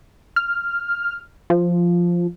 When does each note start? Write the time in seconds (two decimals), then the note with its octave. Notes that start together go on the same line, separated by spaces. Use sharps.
0.36 F6
1.50 F3